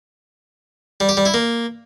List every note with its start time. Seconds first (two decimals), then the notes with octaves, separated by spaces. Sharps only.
1.00 G3
1.09 G4
1.17 G3
1.25 E4
1.34 A#3